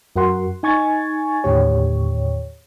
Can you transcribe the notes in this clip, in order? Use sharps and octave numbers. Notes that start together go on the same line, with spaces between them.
F#2 F#4 A#4 F#5 C6
D#4 G#5 C#6 G#6 A6
D#2 A2 D3 G4 C#5